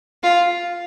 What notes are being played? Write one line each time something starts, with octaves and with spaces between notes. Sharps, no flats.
F4